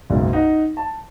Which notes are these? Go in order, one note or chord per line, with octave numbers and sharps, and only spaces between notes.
F#1 B1 G#2
D#4 F#5
A5